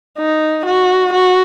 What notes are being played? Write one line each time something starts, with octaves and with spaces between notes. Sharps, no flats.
D#4
F#4
F#4